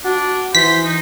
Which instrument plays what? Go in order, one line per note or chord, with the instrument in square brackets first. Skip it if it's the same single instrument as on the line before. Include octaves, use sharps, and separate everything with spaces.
[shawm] D4 [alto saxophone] F#4
[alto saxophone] E3 [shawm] C5 [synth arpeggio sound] B6
[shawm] D#4